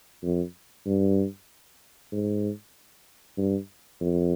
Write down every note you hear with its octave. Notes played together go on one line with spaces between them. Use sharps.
F2
G2
G#2
G2
F2